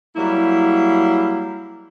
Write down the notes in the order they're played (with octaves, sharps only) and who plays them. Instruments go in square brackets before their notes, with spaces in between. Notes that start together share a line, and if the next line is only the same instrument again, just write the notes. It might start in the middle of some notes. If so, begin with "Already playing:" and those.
[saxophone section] F#3 G3 A#3 E4